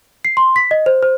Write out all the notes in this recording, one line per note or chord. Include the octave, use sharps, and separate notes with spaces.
C7
C6
B6
D#5
C5
C5